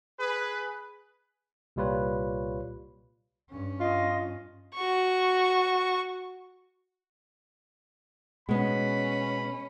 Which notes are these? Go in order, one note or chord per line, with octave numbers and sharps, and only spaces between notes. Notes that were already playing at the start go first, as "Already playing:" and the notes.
G#4 B4
C2 A#2 G3 F4 B4 C#5
G2 C#4
F4 D#5
F#4 C#6
B2 G#3 B3 C#4 B5